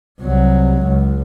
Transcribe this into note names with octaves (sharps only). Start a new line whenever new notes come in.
C2 F#3
C#2